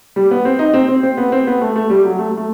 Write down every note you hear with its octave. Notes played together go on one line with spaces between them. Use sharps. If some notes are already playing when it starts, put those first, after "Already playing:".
G3
B3
C4
D#4
C4
C4
C4
B3
C4
B3
A3
A3
G3
F#3
A3
A3